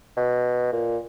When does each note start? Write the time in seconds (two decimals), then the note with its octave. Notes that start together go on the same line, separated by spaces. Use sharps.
0.17 B2
0.73 A#2